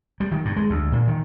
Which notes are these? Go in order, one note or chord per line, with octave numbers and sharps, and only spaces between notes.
G3
D#3
G2
G#3
D2
A#2
D#3